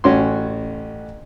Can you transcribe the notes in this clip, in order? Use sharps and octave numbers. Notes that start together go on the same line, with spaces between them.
A1 C#4 F#4 C6